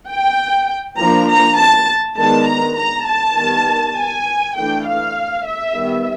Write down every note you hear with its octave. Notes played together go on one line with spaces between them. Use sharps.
G5
F3 A#3 D4 A#5
A#5
A5
D#3 G#3 B3 D4 A5
A#5
A#5
A5
D#3 G3 B3
G#5
E3 A3 D4 G5
F5
E5
D#3 G3 B3